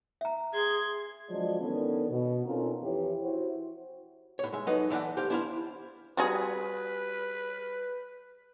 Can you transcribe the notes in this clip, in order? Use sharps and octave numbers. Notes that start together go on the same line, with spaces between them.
E5 A#5
G#4 C6 G#6
D3 F3 F#3 G#3 F4 D5
D#3 B3 C#4 D4 A4 B4
B2
C4 C#4 D#4 F4 A4 A#4
F2 E3 E4 G4 B4 C#5
E4 F#4 C5
A2 C#5
G#3 E5
F#3 A3 D#4 B4 D#5
E3 A3 D5 F5 F#5
G4 C5 F5
D4 E4 C5 F5
G3 F#4 G#4 B4